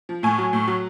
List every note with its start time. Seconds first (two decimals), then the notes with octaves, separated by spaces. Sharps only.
0.09 F3
0.23 A2 G#5
0.38 F#3
0.53 A2
0.68 F#3